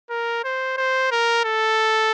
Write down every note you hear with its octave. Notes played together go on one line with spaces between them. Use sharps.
A#4
C5
C5
A#4
A4